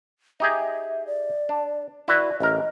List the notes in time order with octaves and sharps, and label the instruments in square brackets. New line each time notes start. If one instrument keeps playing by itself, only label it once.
[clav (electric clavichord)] D#4 G4 G#4 [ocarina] E5
[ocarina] D5
[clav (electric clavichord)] D4
[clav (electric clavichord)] E4 F#4 B4 [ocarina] D5
[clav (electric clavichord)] A1 A#4 [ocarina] D#5